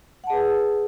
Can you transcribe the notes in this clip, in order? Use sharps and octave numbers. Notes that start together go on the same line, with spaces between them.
G#4 B4 F#5 A5